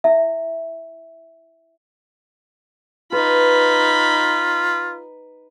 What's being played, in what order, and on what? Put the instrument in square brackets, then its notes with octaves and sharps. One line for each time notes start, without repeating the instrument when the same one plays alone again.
[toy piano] E4 E5
[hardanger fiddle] D#4 B5 [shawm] F4 [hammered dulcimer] B4